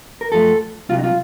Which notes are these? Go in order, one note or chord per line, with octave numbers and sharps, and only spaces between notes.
A#4
F#2 F3 A3 A4
C2 C3 F#3 F4
D#4
F4